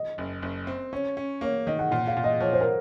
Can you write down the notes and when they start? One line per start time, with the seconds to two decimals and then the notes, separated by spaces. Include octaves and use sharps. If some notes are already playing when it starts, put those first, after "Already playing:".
Already playing: D#5
0.18 F#1
0.42 F#1
0.67 C4
0.93 C#4 C#5
1.17 C#4
1.41 A#3 C#5
1.67 D#3 D#5
1.79 F#5
1.91 A#2 F#5
2.07 F5
2.16 A#2
2.24 D#5
2.40 F3 C#5
2.53 C5
2.61 A#4